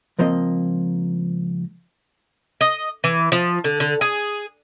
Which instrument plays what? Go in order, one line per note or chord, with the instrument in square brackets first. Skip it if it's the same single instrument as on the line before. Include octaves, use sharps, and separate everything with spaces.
[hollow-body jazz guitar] C#2 F3 A#3 C4 D#5
[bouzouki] D#5
E3
F3
D3
D3
G#4